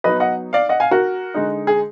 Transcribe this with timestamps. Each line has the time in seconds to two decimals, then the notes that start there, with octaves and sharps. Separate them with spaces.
0.04 F#3 B3 D#4 B4 D#5
0.20 D#5 F#5
0.53 D5 F5
0.69 D#5 F#5
0.80 F5 G#5
0.91 F#4 A#4
1.34 D3 G#3 D#4
1.67 G#4